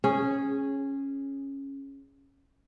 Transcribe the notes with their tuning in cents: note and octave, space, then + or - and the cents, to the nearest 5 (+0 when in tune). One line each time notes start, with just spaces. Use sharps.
C#4 -10 G#4 +0